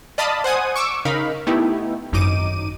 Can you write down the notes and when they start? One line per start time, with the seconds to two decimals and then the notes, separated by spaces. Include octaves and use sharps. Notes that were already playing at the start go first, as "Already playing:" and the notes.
0.18 D5 D#5 F5 A5 B5 D#6
0.44 C5 F#5 G#5 D#6
0.76 C#6 D6 E6
1.05 C#3 D#4 A#4 F5 B5
1.47 A3 B3 D#4 E4 G4
2.12 G#1 F#2 D#4 D6 D#7